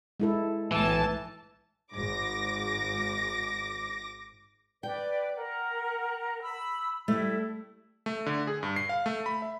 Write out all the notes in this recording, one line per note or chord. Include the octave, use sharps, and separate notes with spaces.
G#3 E4 A4
B1 A2 E3 A5
G#1 G#2 D6 A#6
B4 D5 G5
A#4 F#5
B5 E6
G3 A3 E4
A3
D3
G#4
G2
C7
F5
A3
B5
E5